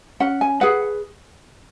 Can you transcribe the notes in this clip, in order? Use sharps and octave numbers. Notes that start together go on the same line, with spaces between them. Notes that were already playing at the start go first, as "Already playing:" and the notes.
C#4 F#5
G#5
G#4 B4 F#5